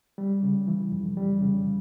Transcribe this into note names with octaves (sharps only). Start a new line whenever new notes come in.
G3
C#3
E3
F2
G3
C#3